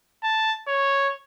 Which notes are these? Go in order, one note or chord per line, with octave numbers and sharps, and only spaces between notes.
A5
C#5